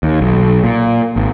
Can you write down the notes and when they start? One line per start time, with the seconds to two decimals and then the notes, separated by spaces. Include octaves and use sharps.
0.03 D#2
0.21 B1
0.64 A#2
1.16 G#1